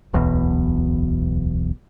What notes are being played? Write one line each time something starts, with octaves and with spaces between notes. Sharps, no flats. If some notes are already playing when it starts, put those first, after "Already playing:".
D1 B1 E2 B2